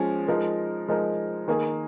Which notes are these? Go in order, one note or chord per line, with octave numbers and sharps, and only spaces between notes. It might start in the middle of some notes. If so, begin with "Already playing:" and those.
Already playing: F3 G#3 C#4
F3 G#3 D#4 A#4
F3 G#3 D#4 A#4
D#3 A#3 D#4 G#4